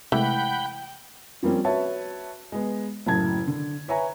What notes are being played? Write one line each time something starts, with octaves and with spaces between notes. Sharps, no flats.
C3 E3 G#3 A3 F#5 G5 B5 G6
F3 G3 A#3 C4 C#4
F#4 B4 C#5 E5 A5
G#3 B3
F#1 A2 C#3 A5 G#6
D3
B4 C#5 E5 G#5 A#5